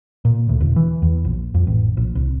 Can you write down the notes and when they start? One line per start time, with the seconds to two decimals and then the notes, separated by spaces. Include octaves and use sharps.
0.25 A#2
0.49 D2
0.60 E1
0.76 E3
1.02 E2
1.25 A#1
1.54 F2
1.67 A1
1.97 A#1
2.15 C2